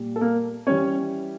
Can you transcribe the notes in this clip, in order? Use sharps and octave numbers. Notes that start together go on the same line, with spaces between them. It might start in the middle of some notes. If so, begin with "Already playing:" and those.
Already playing: A#2 G3
A4
A#3 A#4
E3 G3 C#4 C#5